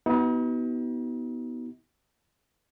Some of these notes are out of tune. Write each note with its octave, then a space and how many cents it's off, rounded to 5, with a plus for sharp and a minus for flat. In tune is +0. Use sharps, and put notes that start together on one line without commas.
B3 +0 D#4 +45 F#4 +40